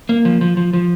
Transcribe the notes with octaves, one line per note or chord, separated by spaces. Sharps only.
A#3
F3
F3
F3
F3